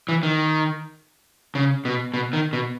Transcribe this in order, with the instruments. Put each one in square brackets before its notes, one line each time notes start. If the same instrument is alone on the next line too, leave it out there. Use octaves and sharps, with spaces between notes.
[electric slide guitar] E3
D#3
C#3
B2
B2
D#3
B2